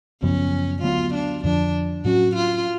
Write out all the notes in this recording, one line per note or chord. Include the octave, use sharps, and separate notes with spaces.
F#2 C#3 F3 B3 C#4
D2 D3 F#3 B3 F4
D4
F2 D3 F3 D4
A2 F#3 C#4 F#4
F4